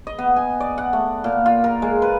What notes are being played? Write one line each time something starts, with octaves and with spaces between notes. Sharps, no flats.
D#5
B3
G#5
D5
F#5
A3
A#2
F4
A#4
G#3
B4